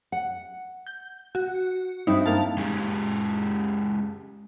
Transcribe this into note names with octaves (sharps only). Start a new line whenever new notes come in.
F#5
G6
F#4
G2 C4 D#4 E4
A#3 F5 A5
G#3 C#4 G4 G#4